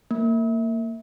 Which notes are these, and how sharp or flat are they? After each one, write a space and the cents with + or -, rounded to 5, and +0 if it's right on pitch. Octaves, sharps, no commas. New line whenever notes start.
A#3 -25